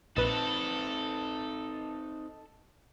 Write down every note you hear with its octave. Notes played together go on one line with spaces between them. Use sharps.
A#1 C4 D#4 A4 B4